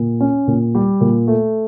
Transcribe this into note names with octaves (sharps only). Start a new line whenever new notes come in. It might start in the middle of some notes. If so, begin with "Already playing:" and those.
Already playing: A#2
C#4
A#2
G3
A#2
A3